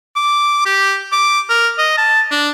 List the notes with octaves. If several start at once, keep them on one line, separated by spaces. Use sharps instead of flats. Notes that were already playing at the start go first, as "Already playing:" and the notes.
D6
G4
D6
A#4
D#5
A5
D4